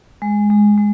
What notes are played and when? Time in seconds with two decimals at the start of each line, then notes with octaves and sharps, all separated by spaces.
0.22 G#3
0.50 G#3
0.78 G#3